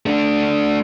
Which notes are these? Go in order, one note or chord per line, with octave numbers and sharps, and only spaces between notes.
A3 D4